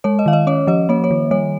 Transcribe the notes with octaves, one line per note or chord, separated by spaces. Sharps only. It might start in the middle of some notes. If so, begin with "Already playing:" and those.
G#3 C#5
D#5
D#3 F5
D#5
C#4 C#5
F3 D#5
A#3 C#5
C#5
D#3
G3 C#5